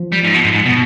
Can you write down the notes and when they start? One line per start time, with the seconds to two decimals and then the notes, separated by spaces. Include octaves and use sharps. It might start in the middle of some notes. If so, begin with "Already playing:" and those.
Already playing: F3
0.12 G3
0.24 G#2
0.34 B2
0.44 G#2
0.54 G#2
0.66 B2